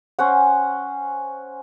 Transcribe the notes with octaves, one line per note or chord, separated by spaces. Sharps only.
C#4 C5 F#5